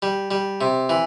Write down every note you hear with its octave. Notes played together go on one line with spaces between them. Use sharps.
G3
G3
C3
E3